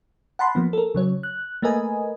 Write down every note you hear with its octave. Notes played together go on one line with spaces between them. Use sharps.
F#5 A5 B5 C6
F3 A#3 B3
A4 A#4
C#3 F#3 C#5
F#6
A3 A#3 A#4 B4 D#5 G#5